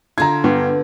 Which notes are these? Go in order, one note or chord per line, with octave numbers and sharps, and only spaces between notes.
D3 F4 A#5 G#6
G2 B3